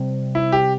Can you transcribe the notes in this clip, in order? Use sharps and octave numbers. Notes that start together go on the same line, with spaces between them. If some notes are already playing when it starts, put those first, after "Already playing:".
Already playing: C3 G3 C4
E4
G4